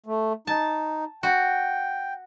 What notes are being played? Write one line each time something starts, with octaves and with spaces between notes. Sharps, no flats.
A3
D#4 A5
F#4 G5